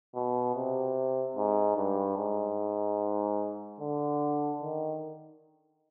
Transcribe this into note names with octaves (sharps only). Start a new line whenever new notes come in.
B2
C3
G#2
G2
G#2
D3
D#3